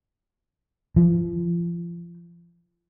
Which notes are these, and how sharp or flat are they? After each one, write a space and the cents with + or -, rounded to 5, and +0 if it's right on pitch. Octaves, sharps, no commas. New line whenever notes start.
F3 -30